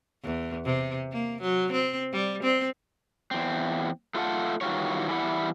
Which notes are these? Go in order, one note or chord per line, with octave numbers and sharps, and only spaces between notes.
E2
C3
A#3
F#3
C4
G3
C4
E2 C4
A3 F4 A4 F#5
D#3 E3 G3 F4 F#4 C#5
E3 G3 G#3 E4 F#5